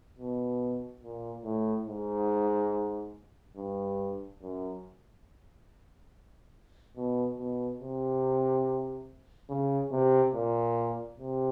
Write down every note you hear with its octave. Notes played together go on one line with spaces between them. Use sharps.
B2
A#2
A2
G#2
G2
F#2
B2
B2
C3
C#3
C3
A#2
C3